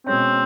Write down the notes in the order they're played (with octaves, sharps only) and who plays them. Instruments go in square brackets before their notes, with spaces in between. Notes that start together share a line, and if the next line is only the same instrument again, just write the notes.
[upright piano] B2 G#3 C#4 [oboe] C4